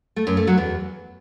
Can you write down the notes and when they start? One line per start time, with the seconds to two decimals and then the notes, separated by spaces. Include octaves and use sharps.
0.16 A3
0.27 F#2
0.37 A3
0.47 F#3
0.58 E2